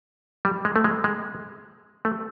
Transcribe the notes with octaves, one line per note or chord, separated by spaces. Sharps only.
G3
G#3
A3
G#3
G#3
A3